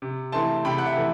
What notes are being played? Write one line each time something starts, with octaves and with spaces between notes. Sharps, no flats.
C3
E3 A3 C4 E4 A5 C6
C3 G5 B5
F#5
E5
E3 A3